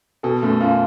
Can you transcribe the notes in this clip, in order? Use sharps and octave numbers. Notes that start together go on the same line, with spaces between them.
B2 A4
F#2 A3
F#2 F4